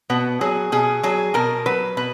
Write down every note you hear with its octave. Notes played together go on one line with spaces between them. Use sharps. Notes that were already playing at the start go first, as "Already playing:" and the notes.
B2 B3
F#3 G#4
B2 G#4
F#3 G#4
B2 A#4
F#3 B4
B2 B4